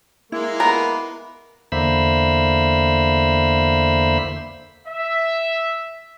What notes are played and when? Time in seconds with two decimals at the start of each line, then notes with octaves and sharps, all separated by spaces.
0.32 G#3 A#3 E4
0.60 B3 A#4
1.72 E2 D3 A#3 C5 E5 B5
4.87 E5